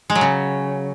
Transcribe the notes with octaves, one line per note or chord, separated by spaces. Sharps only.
G#3
F#3
C#3